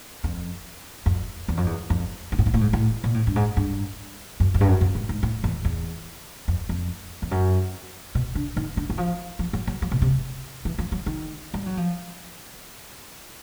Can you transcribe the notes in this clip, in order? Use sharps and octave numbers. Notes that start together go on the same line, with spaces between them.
F2
F2
E2
F2
E2
F2
G#2
A2
G#2
A2
G#2
A2
A#2
A2
G2
G#2
G2
F#2
F2
G2
F#2
F#2
G#2
G#2
A2
E2
E2
F2
F2
F2
F#2
B2
D3
D#3
D3
E3
F3
F3
F#3
F#3
F3
B2
C3
E3
F3
F#3
D#3
G3
F#3
F3